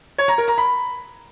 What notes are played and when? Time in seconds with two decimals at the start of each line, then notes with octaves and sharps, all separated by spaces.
0.18 C#5
0.28 A#5
0.38 A#4
0.48 A#5
0.58 B5